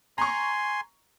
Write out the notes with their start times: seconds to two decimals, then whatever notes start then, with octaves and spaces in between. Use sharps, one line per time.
0.18 G#5 A#5 C6 C#6